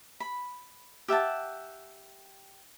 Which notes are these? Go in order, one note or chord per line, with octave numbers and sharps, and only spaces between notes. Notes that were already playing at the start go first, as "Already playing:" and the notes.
B5
G4 E5 F#5 A5